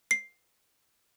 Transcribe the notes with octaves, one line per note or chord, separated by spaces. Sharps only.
C7